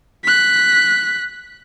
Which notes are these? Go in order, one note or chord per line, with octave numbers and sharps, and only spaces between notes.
F#6 B6